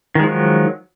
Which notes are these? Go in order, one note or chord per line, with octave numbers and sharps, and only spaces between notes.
D#3 F3 F#3 G#3